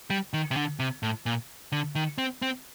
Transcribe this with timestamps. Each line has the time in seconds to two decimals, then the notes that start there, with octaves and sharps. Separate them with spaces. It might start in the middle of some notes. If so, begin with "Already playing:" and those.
0.10 G3
0.33 D#3
0.51 C3
0.57 D3
0.79 C3
1.03 A2
1.26 A#2
1.72 D3
1.95 D#3
2.18 C4
2.42 C4